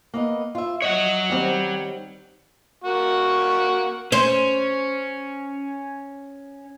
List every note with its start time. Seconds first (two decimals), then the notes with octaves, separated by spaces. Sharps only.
0.14 A#3 B3 D#5
0.55 F4 E5
0.82 C#5 D#5 F#5
1.30 D#3 G3 C4
2.84 A#3 F#4 C#6
4.12 C#4 C5